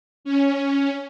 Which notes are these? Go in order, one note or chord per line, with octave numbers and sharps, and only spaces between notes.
C#4